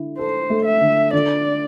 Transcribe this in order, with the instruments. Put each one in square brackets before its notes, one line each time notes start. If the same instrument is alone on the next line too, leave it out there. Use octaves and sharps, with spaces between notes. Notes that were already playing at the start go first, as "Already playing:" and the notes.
Already playing: [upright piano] D3 E4
[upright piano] A4 [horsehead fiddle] C5
[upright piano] A3
[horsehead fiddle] E5
[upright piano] D3
[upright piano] D3 [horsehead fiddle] D5